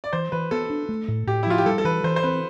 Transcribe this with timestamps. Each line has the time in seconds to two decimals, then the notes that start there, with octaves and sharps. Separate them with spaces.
0.04 D5
0.13 E3 C5
0.32 E3 B4
0.51 B3 A4
0.70 D4
0.89 A3
1.08 A2
1.27 A2 G4
1.43 E4
1.46 F3 F4
1.58 G4
1.66 G3 A4
1.78 A4
1.85 E3 B4
2.04 E3 C5
2.16 C5
2.23 C4 B4